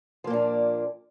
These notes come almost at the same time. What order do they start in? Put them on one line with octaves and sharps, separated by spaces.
F3 A#3 A#2 D4